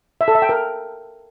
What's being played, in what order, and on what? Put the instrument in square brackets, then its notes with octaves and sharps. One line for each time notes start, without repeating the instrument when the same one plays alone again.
[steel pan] E5
A4
E5
G5
A#4